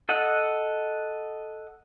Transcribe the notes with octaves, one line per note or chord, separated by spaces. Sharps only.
A4 D#5 F#5